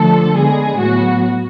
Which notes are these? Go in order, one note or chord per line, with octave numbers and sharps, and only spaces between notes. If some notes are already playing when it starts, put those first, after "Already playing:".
Already playing: D3 F3 A3 A4
D3 G#3 B3 G#4
A2 F#3 B3 F#4